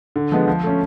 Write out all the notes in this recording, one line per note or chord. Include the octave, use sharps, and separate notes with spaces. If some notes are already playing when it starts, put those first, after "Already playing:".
D3
F3 G#3 B3
F3
A3 C#4